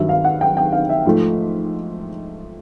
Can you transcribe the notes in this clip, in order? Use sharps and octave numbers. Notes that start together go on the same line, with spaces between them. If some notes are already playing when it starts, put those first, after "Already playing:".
Already playing: G2 D#3 F#3 E5
F5
F#5
G5
G5
F5
E5
G#2 F3 A3